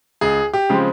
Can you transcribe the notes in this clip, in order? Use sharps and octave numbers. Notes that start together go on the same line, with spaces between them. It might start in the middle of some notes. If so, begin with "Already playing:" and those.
C#2 G#4
G4
C#3 F3 G#3 C4